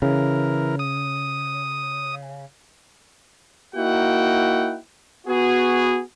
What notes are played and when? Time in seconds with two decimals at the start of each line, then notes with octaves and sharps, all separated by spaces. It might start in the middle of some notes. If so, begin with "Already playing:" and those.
0.02 C#3 E3 A#4
0.79 D#6
3.76 A#3 D#4 E4 F#4 F#5 G5
5.27 B3 F#4 G#4